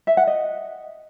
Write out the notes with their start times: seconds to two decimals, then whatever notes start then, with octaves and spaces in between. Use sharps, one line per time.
0.07 E5
0.17 F#5
0.27 D#5